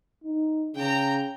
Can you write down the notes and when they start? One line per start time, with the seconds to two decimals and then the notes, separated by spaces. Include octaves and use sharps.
0.24 D#4
0.75 C#3 G5 A#5